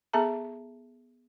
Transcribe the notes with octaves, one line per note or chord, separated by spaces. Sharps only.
B3 G#4 A4 E5 A5 A#5